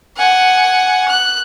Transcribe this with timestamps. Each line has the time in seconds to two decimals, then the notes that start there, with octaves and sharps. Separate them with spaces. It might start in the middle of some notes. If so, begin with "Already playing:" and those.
0.17 F#5 G#5
1.08 F#6